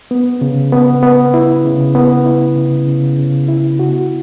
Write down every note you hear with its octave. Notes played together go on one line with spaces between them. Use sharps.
B3
C#3
B3
B3
E4
C#3
B3
E4
C#3
C#3
C#3
E4
F#4